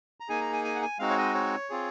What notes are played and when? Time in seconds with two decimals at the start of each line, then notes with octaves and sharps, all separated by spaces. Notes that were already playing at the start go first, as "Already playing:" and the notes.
0.20 A#5
0.29 A#3 D#4 G#4 G#5
0.41 A#5
0.53 G#5
0.64 G#5
0.75 F#5
0.82 G#5
0.99 G#3 C4 D#4 F#4 F5
1.10 C#5
1.17 D#5
1.34 C#5
1.70 C4 F4 G#4